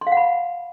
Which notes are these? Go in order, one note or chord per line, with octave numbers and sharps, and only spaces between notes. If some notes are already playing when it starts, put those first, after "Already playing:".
C6
F5
F#5
B5